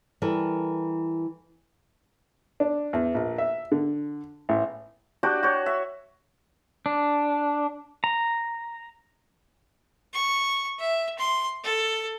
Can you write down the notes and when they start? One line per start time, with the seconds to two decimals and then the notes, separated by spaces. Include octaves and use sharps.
0.22 E3 G3 A4 A#4
2.60 D4
2.93 E2
3.14 A#1
3.38 E5
3.72 D3
4.49 A1
5.23 D4 F#4 G4 D5
5.43 F#4 C#5
5.66 E5
6.86 D4
8.04 A#5
10.14 C#6
10.79 E5
11.19 C6
11.64 A4